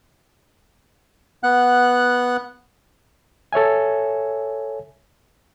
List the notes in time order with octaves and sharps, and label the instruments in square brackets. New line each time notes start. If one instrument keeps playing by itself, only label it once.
[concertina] B3 F#5 F#6
[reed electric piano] A4 C#5 E5 G#5